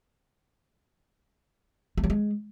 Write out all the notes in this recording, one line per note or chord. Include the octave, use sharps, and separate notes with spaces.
A3
F#3
G#3